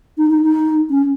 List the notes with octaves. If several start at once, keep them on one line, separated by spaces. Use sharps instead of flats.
D#4
D#4
D#4
C#4